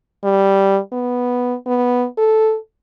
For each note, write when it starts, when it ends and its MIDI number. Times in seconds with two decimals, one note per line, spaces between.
0.24 0.79 55
0.93 1.55 59
1.67 2.06 59
2.18 2.57 69